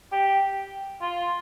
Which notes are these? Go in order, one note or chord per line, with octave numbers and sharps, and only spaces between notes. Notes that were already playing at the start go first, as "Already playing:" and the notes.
G4
F4